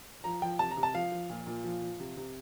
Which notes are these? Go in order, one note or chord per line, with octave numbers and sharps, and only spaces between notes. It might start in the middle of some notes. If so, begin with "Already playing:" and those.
F3 A#5
F3 G5
C3 A5
A#5
C3
A5
F3 F5
F3
A#2
A#2
F3
F3
C3
C3